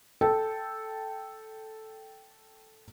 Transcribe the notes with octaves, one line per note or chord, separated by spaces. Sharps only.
A4 G5 A5